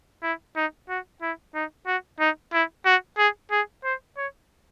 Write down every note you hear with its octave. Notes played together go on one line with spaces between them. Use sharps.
E4
D#4
F#4
E4
D#4
F#4
D#4
E4
F#4
G#4
G#4
C5
C#5